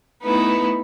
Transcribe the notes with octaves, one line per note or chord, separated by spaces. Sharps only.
A3 B3 D#4 E4 B4